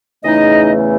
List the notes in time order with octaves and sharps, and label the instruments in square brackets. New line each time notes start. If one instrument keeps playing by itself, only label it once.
[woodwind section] E2 C#3 E3 A3 D#4 D#5